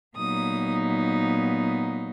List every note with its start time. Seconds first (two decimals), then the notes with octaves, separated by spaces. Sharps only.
0.17 A#2 F#3 B3 D#4 D#6